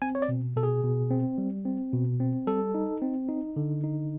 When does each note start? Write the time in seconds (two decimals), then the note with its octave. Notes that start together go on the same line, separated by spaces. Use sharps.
0.02 C4 G#5
0.15 C#5
0.22 D5
0.29 B2
0.56 B2 A4
0.63 G#4
0.84 B2
1.11 C4
1.38 G3
1.65 C4
1.93 B2
2.20 C4
2.47 G3 A4
2.74 D#4
3.02 C4
3.29 D#4
3.56 D3
3.84 D#4